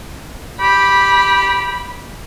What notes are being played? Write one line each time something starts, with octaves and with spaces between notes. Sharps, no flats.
G4 B5